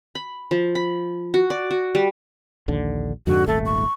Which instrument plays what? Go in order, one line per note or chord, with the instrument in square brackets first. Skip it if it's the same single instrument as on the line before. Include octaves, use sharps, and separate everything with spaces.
[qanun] B5
F3
B5
F#4
D5
F#4
G3
[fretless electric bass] A#1 D#2 D3
[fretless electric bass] F2 G#2 D3 [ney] F#4
[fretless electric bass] D#1 G#1 A3 [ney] A4
[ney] C#6